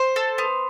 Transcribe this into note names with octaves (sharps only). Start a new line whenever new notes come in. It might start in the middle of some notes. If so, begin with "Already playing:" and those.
Already playing: C5
A4
B3